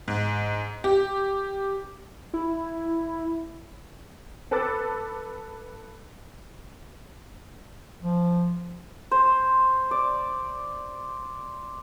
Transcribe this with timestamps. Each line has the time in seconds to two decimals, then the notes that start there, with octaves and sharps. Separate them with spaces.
0.08 G#2
0.84 G4
2.34 E4
4.51 A4 B4 A5 D6 E6 A6
8.03 F3
9.11 C5
9.91 D5